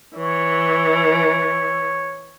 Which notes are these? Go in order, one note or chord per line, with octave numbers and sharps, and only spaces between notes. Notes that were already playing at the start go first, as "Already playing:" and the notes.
E3 C#5